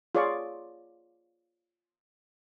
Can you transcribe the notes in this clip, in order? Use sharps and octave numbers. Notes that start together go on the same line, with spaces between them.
F4 G#4 C#5 D5 C#6